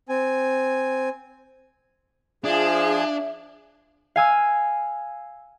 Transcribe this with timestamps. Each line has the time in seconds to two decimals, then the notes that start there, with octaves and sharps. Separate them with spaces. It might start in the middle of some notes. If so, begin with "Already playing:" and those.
0.09 C4 G#5
2.44 F3 D4 G#4 E5
4.16 F5 G#5 E6